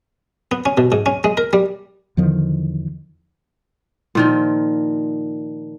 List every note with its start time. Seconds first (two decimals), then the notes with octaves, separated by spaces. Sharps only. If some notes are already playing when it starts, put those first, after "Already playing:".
0.51 B3
0.66 C#4
0.77 B2
0.92 G#2
1.06 C#4
1.24 G#3
1.37 A#4
1.53 G3
2.17 E2 D3 D#3 F3
4.15 A#2 D#3 F3